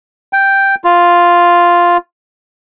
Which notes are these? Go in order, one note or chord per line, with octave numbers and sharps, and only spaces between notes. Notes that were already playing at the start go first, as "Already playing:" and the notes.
G5
F4